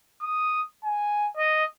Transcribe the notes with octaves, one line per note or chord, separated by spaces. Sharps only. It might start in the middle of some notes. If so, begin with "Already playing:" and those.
D#6
G#5
D#5